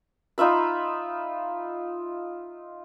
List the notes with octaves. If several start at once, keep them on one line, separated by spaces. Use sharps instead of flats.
D#4 F4 E5 B5